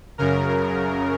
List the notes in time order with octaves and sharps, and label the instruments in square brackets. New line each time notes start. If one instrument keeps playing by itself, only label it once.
[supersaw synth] F#2 C#3 A#4